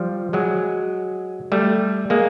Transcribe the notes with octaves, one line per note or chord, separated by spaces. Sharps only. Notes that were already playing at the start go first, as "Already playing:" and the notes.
Already playing: F3 G3
F#3 G#3
G3 A3
G#3 A#3